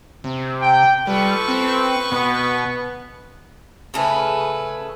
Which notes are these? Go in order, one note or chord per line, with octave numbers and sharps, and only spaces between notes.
C3
G5
G3 F4 A4 B4 C#6
C4
B2 B3
C#3 A3 B4 G#5